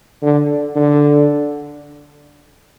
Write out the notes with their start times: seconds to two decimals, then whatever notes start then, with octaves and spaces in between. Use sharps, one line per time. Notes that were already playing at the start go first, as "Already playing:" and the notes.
0.22 D3
0.76 D3